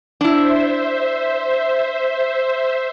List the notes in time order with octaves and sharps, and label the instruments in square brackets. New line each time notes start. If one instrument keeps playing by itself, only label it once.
[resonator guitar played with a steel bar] D4 E4 [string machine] C5 E5